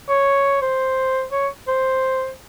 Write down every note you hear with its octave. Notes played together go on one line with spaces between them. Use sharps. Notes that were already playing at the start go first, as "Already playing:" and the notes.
C#5
C5
C#5
C5